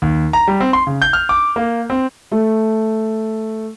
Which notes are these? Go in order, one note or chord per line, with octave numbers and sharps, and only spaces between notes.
D#2
A#5
G3
C4
C6
C#3
G6
F6
D6
A#3
C4
A3